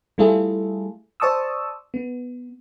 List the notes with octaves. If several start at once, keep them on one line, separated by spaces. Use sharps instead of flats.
G3 A3 E4 F4 G#4 A4
C5 D5 A5 C#6 D#6 E6
B3